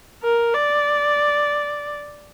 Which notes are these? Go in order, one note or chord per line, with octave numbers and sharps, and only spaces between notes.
A#4
D5